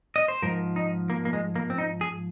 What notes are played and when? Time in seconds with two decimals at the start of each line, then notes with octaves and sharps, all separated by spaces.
0.16 D#5
0.28 C5
0.42 G#2 F3 A#4
0.76 D#4
1.10 A#3
1.25 A#3
1.33 G#3
1.56 A#3
1.70 C4
1.78 D#4
2.01 G#4